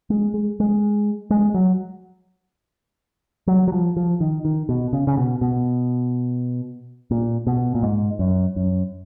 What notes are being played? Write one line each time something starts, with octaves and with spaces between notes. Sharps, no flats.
G#3
G#3
G#3
G#3
F#3
F#3
F#3
F3
F3
D#3
D#3
B2
C#3
C#3
B2
B2
A#2
B2
A#2
G#2
F#2
F#2